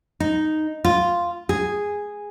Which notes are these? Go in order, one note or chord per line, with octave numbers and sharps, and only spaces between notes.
D#4
F4
G#4